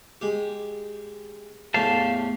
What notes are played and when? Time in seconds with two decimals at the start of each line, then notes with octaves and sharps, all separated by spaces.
0.21 G#3 G4
1.74 E2 A2 E3 G4 F5 A5